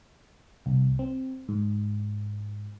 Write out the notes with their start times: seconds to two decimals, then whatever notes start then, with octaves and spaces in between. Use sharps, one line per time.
0.66 C2
0.99 C4
1.49 G#2